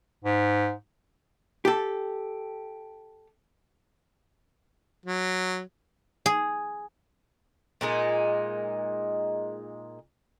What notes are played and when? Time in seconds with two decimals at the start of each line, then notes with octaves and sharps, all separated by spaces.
0.24 G#2
1.65 G4 A4
5.06 F#3
6.26 G#4
7.81 A#2 G#3 D#4